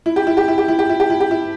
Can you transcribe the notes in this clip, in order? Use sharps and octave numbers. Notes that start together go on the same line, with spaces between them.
E4
G4
E4
G4
E4
G4
E4
G4
E4
G4
E4
G4
E4